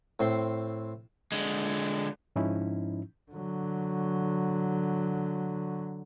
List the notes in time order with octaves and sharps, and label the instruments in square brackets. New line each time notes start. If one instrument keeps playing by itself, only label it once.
[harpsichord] A2 C4 C6
[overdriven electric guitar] D3 G#3
[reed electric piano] G#2 F3 C#4 D#4 E4
[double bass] D3 F#3